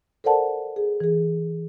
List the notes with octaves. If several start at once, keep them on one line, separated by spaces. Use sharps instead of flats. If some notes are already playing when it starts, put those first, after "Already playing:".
A4 A#4 C5 D5 F#5 A5
G#4
E3 G#4